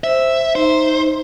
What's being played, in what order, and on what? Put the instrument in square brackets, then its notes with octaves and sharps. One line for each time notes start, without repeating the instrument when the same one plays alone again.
[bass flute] C5 [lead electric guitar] E5
[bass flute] D#4 [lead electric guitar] C5